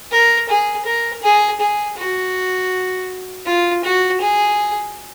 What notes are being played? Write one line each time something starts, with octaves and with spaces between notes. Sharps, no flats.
A#4
G#4
A#4
G#4
G#4
F#4
F4
F#4
G#4